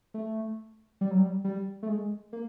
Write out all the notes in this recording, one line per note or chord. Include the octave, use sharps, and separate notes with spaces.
A3
G3
F#3
G3
G3
A3
G#3
A#3